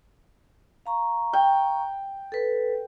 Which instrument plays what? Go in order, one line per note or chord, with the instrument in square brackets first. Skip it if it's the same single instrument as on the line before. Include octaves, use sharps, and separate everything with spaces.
[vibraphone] F5 A#5 C#6
[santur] G5
[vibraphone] A4 B4